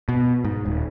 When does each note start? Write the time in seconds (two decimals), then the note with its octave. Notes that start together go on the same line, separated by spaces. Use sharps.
0.09 B2
0.44 G#2
0.66 D#1